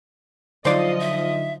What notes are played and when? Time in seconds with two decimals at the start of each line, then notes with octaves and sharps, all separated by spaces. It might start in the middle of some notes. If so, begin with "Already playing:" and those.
0.65 D3 F3 F#3 D#4 C5 D5 D#5 F5
1.00 E5